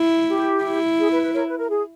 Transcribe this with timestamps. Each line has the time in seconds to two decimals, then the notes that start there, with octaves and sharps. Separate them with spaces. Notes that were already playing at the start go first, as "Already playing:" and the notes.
Already playing: E4
0.28 G4
0.63 E4
0.99 G#4
1.10 B4
1.22 B4
1.34 A#4 C#5
1.47 B4
1.59 A#4
1.70 G#4